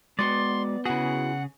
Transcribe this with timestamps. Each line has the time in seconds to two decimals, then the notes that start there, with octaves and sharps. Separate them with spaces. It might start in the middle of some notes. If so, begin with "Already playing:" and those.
0.19 G#3 B3 F#4 D5 C6
0.85 C#3 E4 F#4 G#4 F#5